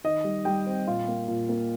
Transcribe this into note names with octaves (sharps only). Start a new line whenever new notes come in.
D#3 D#5
G3
G3 G5
C4
A#2 F4
A#3
A#2
A#3